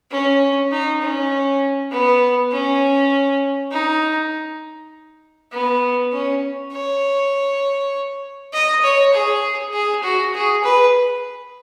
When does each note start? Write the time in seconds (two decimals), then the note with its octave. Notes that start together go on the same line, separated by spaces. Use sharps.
0.11 C#4
0.71 D#4
1.01 C#4
1.91 B3
2.52 C#4
3.71 D#4
5.52 B3
6.12 C#4
6.72 C#5
8.53 D#5
8.83 C#5
9.13 G#4
9.73 G#4
10.03 F#4
10.34 G#4
10.63 B4